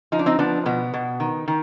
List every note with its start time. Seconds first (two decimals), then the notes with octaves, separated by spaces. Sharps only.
0.12 F3 D#4
0.19 D4
0.26 C4 D#4
0.39 F3 B3 D4
0.66 B2 B3
0.94 B2
1.20 D#3
1.48 D#3